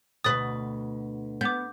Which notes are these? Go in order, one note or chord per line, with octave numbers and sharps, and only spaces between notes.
D2 B2 B4 D#6 A6
B3 D6 G6